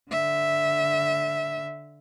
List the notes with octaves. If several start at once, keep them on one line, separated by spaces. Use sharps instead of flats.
D3 E5